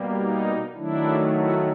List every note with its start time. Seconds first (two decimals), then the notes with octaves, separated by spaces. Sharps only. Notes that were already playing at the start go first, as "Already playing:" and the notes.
Already playing: B2 G3 A#3
0.17 D#4
0.75 D#3 F#3 A3 D4 E4
1.33 E4 F#4